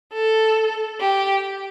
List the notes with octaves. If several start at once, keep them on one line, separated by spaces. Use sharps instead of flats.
A4
G4